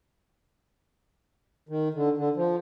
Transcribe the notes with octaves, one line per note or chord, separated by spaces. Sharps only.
D#3
D3
D3
F3